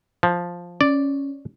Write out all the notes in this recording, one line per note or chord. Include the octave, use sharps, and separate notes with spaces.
F3
C#4 D5